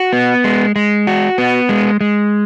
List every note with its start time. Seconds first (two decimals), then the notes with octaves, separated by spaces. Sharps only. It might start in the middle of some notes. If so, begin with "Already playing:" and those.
Already playing: F#4
0.13 B3
0.44 G#3
0.76 G#3
1.07 F#4
1.38 B3
1.69 G#3
2.01 G#3